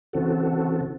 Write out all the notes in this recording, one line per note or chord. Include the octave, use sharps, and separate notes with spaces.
C#3 E3 C4 F#4 A4